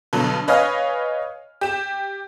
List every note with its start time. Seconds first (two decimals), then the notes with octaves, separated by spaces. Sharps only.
0.13 G2 B2 D3 F#3
0.48 B4 C#5 D#5 F5 G#5 F6
1.61 G4 E7